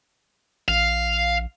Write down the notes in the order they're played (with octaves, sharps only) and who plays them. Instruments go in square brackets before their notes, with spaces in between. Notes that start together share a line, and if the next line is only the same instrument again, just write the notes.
[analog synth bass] A#1 [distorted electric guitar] F5